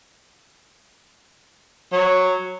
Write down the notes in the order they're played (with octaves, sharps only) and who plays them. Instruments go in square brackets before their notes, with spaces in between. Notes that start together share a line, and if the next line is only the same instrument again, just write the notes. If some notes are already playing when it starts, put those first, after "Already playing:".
[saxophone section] F#3